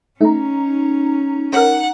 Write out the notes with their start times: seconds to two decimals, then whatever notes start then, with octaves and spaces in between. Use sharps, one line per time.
0.21 A3 C#4 D#4 A#5
1.53 C#4 A#4 F#5